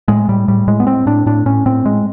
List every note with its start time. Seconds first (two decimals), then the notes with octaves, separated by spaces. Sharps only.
0.08 A2 G#3
0.29 A2 G3
0.48 A2 G3
0.67 A2 G#3
0.80 B3
0.87 A2 C4
1.06 A2 D4
1.26 A2 D4
1.46 A2 C#4
1.66 A2 C4
1.85 A2 G#3